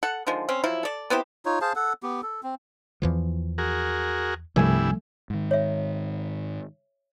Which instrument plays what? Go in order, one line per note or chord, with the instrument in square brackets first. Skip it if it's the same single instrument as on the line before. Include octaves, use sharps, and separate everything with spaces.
[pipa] A4 F#5
D3 D#3 F3 G#3
C4 C#4
F3 F#3 E4
A4 D5
B3 C4 E4 G4
[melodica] D#4 F4 C#5
G#4 C5 F5 A5
A4 F#5
B3 G4
A4
C4
[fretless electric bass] E2 E3 F3
[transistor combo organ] F#4 G#4 A#4
[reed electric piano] C2 G#5 [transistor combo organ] G2 E4 [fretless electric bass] F3 G3 A3
[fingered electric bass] G#2 D#3
[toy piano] C#5 E5